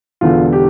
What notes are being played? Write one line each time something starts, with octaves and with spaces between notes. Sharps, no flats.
E1 E2 D3 F4
G4